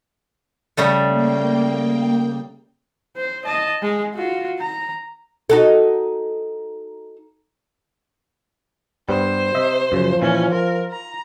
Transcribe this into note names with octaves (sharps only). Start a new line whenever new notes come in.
C#3 G3 A3
A#3 G5
C5
D#5 A5
G#3
F4 F#4
A#5
D#4 F#4 A4
G2 G3 B3 C5
C3 D#5 E5
F#2 C#3 F3
A#2 E3 C#4
F4 A#4
A#5